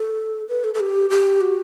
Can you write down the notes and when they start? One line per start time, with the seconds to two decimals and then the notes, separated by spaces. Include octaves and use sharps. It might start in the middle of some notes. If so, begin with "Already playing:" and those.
Already playing: A4
0.49 B4
0.64 A4
0.74 A4
0.80 G4
1.10 G4
1.41 F#4